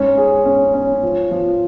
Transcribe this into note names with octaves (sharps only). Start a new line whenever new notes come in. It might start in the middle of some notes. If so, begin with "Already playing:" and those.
Already playing: G#2 C#4
G#4
C#4
C#4
F3
F3